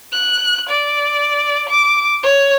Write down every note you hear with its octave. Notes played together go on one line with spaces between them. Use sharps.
F#6
D5
D6
C#5